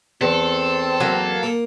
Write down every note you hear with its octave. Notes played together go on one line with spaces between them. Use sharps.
E2 C4 A4
F#3 A#3
A#3